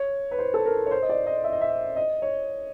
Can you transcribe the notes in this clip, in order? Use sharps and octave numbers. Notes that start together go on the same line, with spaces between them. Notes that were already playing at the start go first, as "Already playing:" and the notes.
Already playing: C#5
B4
C5
A4
A#4
C#5
C5
D#5
D5
D#5
E5
D#5
E5
D#5
C#5